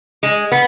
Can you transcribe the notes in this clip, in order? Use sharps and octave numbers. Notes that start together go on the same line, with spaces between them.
G#3
B3